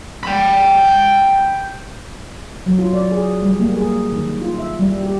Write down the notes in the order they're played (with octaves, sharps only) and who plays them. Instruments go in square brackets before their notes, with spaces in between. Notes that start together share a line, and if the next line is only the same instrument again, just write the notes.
[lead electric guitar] G5 B5
[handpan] F#3
F4
D5
G#4
G3
A#3
G#4
D#3
F4
E5
G3
G4